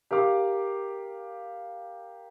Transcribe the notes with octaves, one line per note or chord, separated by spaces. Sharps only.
G4 A#4 F5 D6